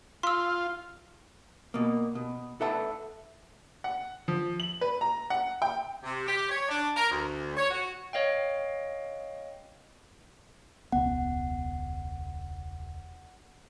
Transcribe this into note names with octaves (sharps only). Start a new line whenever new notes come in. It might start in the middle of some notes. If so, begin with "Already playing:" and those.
F4 C6 E6
B2 A#3
B2
A4 B4 E5 F#5 A5
F#5
F3
F#7
B4
A#5
F#5
G5
C3
G4
C#5
D4
A#4
D2
C#5
F#4
C#5 D#5 F5 G5
E1 C#2 B3 F#5